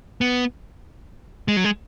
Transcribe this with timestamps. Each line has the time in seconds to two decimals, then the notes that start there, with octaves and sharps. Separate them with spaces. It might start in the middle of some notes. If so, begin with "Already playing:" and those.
0.21 B3
1.48 G#3
1.57 F#3
1.64 G#3